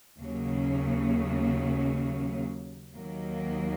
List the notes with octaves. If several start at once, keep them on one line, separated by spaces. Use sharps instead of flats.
D#2 C#3 F#3 A#3 C#4
D#2 D#3 F#3 A#3